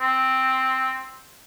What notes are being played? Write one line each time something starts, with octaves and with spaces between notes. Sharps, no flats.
C4